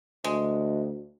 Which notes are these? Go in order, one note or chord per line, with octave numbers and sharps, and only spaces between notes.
D2 G#3